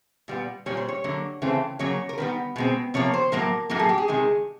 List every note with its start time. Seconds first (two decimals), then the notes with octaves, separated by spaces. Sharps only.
0.28 A#2 G3 B3
0.66 A#2 G3 A#3 C#5
0.77 C5
0.89 C#5
1.04 D3 F#3 A#3
1.42 C#3 E3 A3 C4
1.79 C#3 F#3 A#3 C#5
2.09 A#4
2.18 D#3 G3 B3 B4
2.56 B2 G#3 C4
2.94 C3 F3 A#3 C#5
3.14 C5
3.32 A2 F#3 A#3 A#4
3.70 A2 F#3 A#3 A4
3.79 G#4
3.89 G4
3.98 G#4
4.08 C3 D#3 G#3